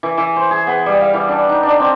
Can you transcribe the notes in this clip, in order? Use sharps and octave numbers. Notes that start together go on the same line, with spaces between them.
E3
E3
C5
G#4
B3
G3
F5
E3
D4
D#4
D4
C4